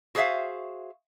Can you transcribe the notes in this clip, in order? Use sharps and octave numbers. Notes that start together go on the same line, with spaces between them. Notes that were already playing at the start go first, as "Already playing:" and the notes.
F#4 G#4 C5 C#5 E5 F5